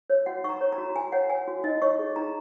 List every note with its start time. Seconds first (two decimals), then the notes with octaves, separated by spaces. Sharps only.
0.10 C#5
0.26 F#4 F#5
0.44 D#4 C#6
0.49 A#5
0.61 C#5
0.72 A#5
0.78 F#4
0.95 F#4 G#5
1.12 C#5 F#5
1.30 C#5 G#5
1.48 F#4
1.64 D#4 D#5
1.82 C#5 C#6
1.99 G#4
2.16 D#4 A#5